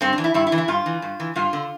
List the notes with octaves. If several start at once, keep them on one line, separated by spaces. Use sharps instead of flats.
G2 C4
D4
E3
E4
G2 E4
E4
E3
E4
G2 F4
E3
G2
E3
G2 F4
D3